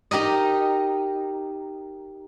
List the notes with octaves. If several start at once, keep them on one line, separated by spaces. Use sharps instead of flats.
D#4 G4 A#4 D#5